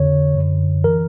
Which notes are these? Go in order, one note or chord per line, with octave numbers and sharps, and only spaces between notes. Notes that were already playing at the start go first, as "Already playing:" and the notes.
Already playing: F2 D3 C#5
F#2 D3
E3 A#4